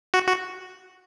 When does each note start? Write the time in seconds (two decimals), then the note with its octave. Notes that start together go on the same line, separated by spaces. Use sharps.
0.14 F#4
0.28 F#4